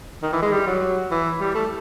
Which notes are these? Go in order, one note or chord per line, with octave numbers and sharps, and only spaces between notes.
D#3
E3
G#3
G3
F#3
E3
G3
A3